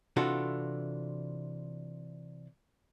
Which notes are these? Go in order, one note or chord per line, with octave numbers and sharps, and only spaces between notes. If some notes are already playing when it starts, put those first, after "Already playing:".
C3 E3 D4 F4 F#4 A4